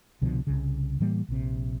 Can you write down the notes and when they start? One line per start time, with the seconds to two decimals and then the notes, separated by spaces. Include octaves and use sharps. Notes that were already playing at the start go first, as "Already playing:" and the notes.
0.22 C2 B2 D3 F3
0.47 C2 C#3
1.00 A2 E3 G3 A#3
1.29 A#1 C3